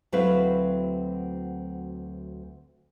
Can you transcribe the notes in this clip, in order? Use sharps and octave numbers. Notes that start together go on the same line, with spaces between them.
D2 F#3 C4 E4 B4 F5